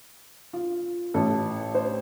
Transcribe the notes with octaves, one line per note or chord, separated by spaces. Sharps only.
F4
A1 A2 A3 A4
C5